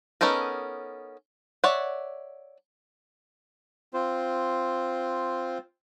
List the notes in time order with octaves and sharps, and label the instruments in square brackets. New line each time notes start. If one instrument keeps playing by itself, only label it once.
[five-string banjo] B3 C#4 D#4 A4 A#4
C#5 D5 E5 F#5
[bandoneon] C4 F4 C5